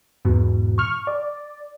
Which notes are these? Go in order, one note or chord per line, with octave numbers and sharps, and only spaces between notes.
E2 G#2 B2
C#6 F6
D5